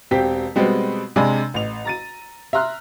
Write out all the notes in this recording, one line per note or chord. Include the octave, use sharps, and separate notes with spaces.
E1 C4 G4 B6
B2 G3 G#3 B3 C4
C3 G#3 D4 D5 G#5 B5
A1 F7
A#5 A6 D#7
E5 A#5 C6 F6 F#6